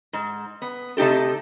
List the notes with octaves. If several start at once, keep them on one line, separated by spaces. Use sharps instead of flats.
G#2
B3
C3 A3 D#4 G4 A4